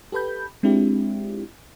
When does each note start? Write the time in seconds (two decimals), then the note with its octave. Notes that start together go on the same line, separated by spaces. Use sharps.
0.12 G4 A4 B4 B5 G6
0.63 G#3 C4 D4 E4 F4 G4